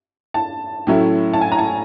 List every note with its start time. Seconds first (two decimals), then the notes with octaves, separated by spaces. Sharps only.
0.34 A5
0.87 A2 F#3 A3 C#4 E4
1.33 A5
1.41 G#5
1.52 A#5
1.59 A5